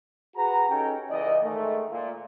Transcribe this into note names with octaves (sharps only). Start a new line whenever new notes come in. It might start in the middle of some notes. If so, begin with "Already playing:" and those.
F#4 G#4 B4 A#5
C#4 D#4 G4 A4 G5
C#2 E3 D5 D#5
G#2 D#3 A3
A#2